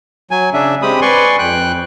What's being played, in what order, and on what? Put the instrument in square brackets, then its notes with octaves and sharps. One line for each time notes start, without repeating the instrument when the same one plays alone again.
[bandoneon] F#3 G#5
C#3 D4 E5
G#3 C4 G4 B5 D#6
B4 D5 G#5 C6 C#6
F2 G5 F#6